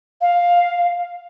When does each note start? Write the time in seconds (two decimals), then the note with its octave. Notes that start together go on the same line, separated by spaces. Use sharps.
0.21 F5